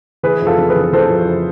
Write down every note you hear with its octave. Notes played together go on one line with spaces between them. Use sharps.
E3 G#4 B4
F2
F4 A4
F2
G#4 B4
E3
E3 A4 C5
F2